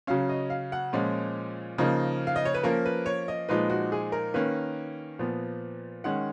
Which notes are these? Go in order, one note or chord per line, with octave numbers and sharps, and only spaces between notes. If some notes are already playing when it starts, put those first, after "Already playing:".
C#3 F#3 C#4 F5
D#5
F5
F#5
A#2 F3 G#3 C#4
C#3 F3 A#3 D#4
F5
D#5
C#5
B4
F3 A#3 C#4 A#4
B4
C#5
D#5
A#2 F3 G#3 D#4 B4
F#4
G#4
A#4
D#3 A#3 C#4 B4
A#2 F3 B3
D#3 G#3 C#4 F#5